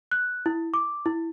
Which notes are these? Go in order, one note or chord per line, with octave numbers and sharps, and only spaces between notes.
F#6
E4
D6
E4